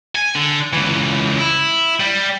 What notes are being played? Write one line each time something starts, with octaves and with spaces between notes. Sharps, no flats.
G#5
D3
C#2 E3
E4
G3